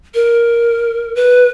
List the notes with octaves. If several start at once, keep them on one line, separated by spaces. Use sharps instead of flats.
A#4
B4